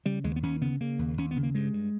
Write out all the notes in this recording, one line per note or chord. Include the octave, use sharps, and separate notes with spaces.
C#3 G3
D#2 G#3
B3
D#2 C#4
C#3 B3
C#3 A#3
D#2
D#2 C#4
B3
C#3
A#3
G2 G#3
G2